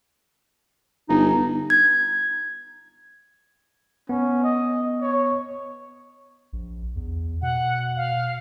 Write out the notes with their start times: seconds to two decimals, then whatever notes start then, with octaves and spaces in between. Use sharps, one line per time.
1.09 G1 D#4
1.70 G#6
4.09 B3 C#4
4.43 D#5
5.01 C#5
6.53 A#1
6.96 E2
7.42 B2 F#5
7.96 F5